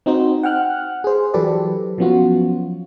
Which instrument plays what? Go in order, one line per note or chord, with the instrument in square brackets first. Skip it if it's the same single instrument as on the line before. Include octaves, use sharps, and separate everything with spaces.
[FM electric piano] C4 D#4 F#4 C5
F#5 G5 F6 F#6
G#4 C5
E3 F#3 G4 A4 B4 D5
F3 F#3 B3 C#4 F4 F#4